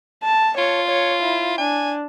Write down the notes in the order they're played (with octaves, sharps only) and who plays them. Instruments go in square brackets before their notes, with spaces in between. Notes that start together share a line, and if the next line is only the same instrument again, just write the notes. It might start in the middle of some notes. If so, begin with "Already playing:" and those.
[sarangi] A5
[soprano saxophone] F4 [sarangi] C#5
[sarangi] C#5
E4
[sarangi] D4 [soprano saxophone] G#5